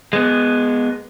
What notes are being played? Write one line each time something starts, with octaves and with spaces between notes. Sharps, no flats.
G#3 B3